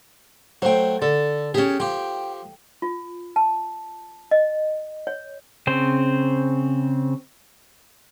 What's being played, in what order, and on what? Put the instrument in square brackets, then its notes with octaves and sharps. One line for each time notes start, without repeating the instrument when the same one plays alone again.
[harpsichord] F#3 A3 [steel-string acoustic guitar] C5 G5
[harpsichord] D3 [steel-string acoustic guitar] A4
[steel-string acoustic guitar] C#4 G4 [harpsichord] G#4 A5
[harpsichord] F3 G4 [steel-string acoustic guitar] G5
[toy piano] F4
A5
D#5
C#5
[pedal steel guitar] C#3 C4 C5